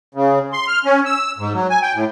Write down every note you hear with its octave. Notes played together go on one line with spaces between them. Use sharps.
C#3
C6
F6
C#4
E6
G#2
F#3
G#5
G5
A2